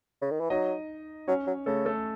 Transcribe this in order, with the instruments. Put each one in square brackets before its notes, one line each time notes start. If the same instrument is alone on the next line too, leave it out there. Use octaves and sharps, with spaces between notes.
[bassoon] C#3
D#3
E3
[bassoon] F#3 [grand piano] D#4 D#5
[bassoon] F#3 [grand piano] C#4 C#5
[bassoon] F#3
[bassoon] C#3 [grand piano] A3 A4
[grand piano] A3 A4